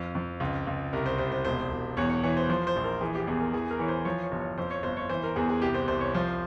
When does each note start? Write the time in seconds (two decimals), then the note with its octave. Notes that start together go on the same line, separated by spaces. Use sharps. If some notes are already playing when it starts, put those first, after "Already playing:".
Already playing: F2
0.15 F2
0.40 C#2
0.67 C#2
0.93 C2 A#4
1.06 C5
1.18 C2 C5
1.32 C5
1.45 E1 C5
1.70 E1
1.97 E2 C#5
2.10 C#5
2.23 E3 C#5
2.37 C5
2.49 F3 C5
2.67 C5
2.76 A#1
2.84 A#4
3.01 E3 G#4
3.15 G4
3.27 E2 G#4
3.40 A#4
3.53 E3 G#4
3.71 A#4
3.79 E3 C#5
3.88 C5
4.05 F3 C#5
4.23 C#5
4.32 G1
4.40 C#5
4.58 F2 C5
4.71 C#5
4.83 G1 C5
4.97 C#5
5.09 E3 C5
5.23 A#4
5.36 E2 G#4
5.49 G#4
5.62 C2 G4
5.74 C5
5.88 C2 C5
6.01 C#5
6.14 F3 C5